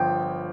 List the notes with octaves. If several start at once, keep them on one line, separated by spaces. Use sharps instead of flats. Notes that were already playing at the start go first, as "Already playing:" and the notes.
Already playing: G1 F3 G5